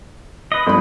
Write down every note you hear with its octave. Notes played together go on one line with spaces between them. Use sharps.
B4 D#5
G1 F3 B5